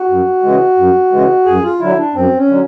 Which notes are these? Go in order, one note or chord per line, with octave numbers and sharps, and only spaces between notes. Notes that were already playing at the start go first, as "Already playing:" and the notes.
Already playing: F#4
F#2
C#3 E3 G#3
F#2
C#3 E3 G#3
F#2 G#4
F4
D3 F#3 E4
D4
F#2 C4
C#4
D3 F#3